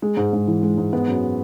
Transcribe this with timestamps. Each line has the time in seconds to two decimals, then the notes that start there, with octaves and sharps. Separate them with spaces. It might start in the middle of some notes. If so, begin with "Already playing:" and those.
0.02 G#3
0.17 G#2
0.33 G#2
0.47 E3
0.63 G#3
0.77 G#2
0.93 G#3 B3
1.08 F#2